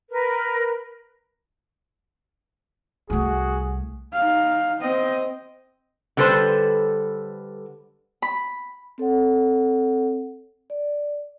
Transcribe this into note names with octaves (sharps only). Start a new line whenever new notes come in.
A#4 B4
C2 A3 F#4 G#4
D#4 F5
C4 D#5
D3 G3 A4 B4 C5
B5
C4 A4 C#5 F#5
D5